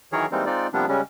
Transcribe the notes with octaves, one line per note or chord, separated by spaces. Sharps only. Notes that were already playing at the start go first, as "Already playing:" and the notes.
D#3 E3 F#3 G#4 A#4 C#5
E3 G3 G#3 A#3 C4 D#4
G#3 C4 D#4 F4 D5
C3 F3 G3 A#3 B3 D4
C#3 G3 G#3 C#4